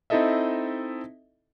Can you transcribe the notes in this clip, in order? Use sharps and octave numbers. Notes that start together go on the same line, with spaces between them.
C4 D#4 E4 A4 D#5 E5